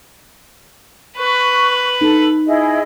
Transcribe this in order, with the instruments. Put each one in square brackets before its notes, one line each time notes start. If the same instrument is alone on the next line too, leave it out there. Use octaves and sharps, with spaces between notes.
[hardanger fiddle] B4 [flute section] C#6 F#6
[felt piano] D#4 [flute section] A4
[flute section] E4 G#4 D#5